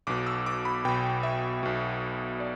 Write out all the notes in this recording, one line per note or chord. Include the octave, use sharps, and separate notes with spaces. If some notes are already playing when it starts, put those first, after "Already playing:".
B1 B2 D6
E6
D6
B5
B1 B2 G5
E5
B1 B2
D5